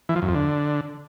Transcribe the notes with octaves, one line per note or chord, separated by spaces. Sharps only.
E3
F3
F#2
F2
D3